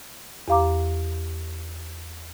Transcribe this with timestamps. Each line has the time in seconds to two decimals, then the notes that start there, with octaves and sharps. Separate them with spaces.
0.48 E2 G4 F5 A#5 D6